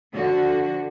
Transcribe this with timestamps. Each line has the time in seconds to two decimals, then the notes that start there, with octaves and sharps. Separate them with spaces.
0.13 D3 F3 F#4